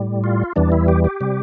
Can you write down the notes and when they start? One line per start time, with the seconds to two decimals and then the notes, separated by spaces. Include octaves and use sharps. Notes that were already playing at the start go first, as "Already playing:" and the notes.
Already playing: A2 G3
0.24 F4
0.56 E2 E3 G3 D4
0.72 E4
0.88 G4
1.04 G4
1.21 C3 G3